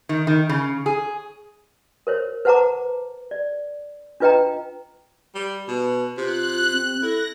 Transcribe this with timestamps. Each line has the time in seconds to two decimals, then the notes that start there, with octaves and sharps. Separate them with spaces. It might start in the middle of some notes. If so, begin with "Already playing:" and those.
0.09 D#3
0.27 D#3
0.49 C#3
0.86 G#4
2.07 A#4 C5 C#5
2.45 B4 C5 F#5 A5 A#5 D6
3.31 D5
4.20 D4 F4 B4 D#5 G5 A#5
5.35 G3
5.68 B2 B4
6.18 C3 F4 F#6
6.73 C4
7.02 E4 A4 A#6